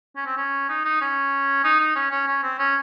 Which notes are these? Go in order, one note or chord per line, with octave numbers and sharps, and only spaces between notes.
C#4
C4
C#4
D#4
D#4
C#4
D#4
D#4
C#4
C#4
C#4
C4
C#4